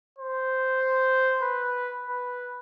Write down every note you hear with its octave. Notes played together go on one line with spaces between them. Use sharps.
C5
B4
B4